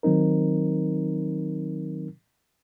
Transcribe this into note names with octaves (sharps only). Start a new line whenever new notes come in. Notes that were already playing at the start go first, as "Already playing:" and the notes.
D#3 F#3 C4 D#4 A#4